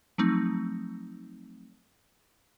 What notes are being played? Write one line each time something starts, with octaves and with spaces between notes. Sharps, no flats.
F3 F#3 A3 C4 D#4